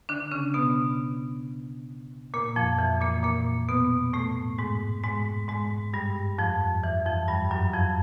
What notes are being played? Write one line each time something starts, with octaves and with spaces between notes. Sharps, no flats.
D3 D4
C#3 C#4
B2 B3
A#2 A#3
F2 F3
E3
A#2 A#3
A#2 A#3
B2 B3
A2 A3
G#2 G#3
G#2 G#3
G#2 G#3
G2 G3
F2 F3
E3
F2 F3
G2 G3
F#2 F#3
F2 F3